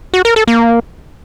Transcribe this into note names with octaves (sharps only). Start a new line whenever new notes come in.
F#4
A#4
A4
A#3